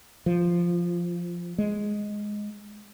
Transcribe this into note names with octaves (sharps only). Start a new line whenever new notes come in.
F3
G#3